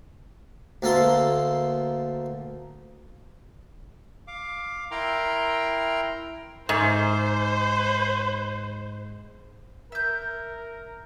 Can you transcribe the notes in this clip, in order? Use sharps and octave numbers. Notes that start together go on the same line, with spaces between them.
D2 A#3 A4 C6
F5 D6
E4 A#4 G5 A#5 C6
G#2 C5
A#4 E5 G6